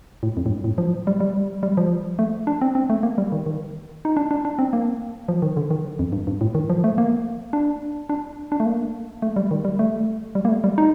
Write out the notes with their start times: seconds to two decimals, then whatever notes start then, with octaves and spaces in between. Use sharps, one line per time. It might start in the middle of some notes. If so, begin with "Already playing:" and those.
0.23 A2
0.37 F2
0.46 A2
0.50 G2
0.64 A2
0.78 F3
1.07 G3
1.20 G3
1.63 G3
1.77 F3
2.19 A3
2.47 D4
2.61 C4
2.75 C4
2.90 A3
3.03 A#3
3.18 G3
3.32 D#3
3.46 D#3
4.05 D#4
4.17 D4
4.31 D4
4.45 D4
4.59 C4
4.73 A#3
5.28 F3
5.42 D#3
5.57 D3
5.70 D#3
5.99 F2
6.12 G2
6.27 G2
6.41 A2
6.55 D#3
6.70 F3
6.84 A3
6.98 A#3
7.53 D4
8.09 D4
8.52 D4
8.60 A3
8.66 A#3
9.22 A3
9.36 G3
9.51 D#3
9.65 G3
9.79 A3
10.35 G3
10.45 A#3
10.49 A3
10.64 G3
10.78 D#4